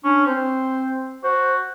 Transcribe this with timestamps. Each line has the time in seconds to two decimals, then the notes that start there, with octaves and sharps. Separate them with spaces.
0.04 C#4 D4
0.26 C4 C5
1.24 F#4 C5